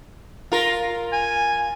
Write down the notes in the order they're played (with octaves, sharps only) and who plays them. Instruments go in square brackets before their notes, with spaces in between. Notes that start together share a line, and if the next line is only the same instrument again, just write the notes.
[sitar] F4 A#4
[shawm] G#5